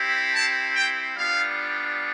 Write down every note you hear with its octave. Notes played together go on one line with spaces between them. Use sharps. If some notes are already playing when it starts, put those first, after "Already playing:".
Already playing: C4 E4 G4
A5
G5
G3 B3 D4 F4 F5